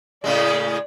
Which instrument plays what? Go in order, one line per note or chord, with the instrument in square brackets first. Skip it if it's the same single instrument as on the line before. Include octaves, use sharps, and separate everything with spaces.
[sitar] A2 C#3 G#3 [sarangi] D5